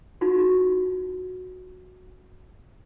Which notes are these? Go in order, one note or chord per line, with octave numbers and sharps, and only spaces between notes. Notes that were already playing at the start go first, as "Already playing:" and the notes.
D#4 F4 F#4